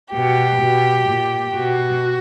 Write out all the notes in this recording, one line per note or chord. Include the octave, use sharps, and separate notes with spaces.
B2 G4
B2
A#2
B2 F#4